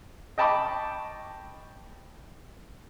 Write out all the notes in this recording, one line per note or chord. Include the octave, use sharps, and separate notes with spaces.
D#5 G5 A5 B5 C#6 D6